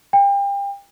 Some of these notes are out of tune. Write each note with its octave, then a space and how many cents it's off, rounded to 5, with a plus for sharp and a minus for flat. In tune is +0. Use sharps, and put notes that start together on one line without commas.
G5 +30